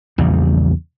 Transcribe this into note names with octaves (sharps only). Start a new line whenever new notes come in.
A#1 E2 C#3 G3